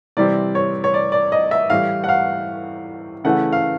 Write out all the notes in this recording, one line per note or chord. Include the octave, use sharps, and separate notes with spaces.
C3 E3 G3 C4 D5
C#5
C#5
D5
D5
D#5
E5
A2 E3 G3 F5
F#5
F5
C#3 E3 A3 F#5
F5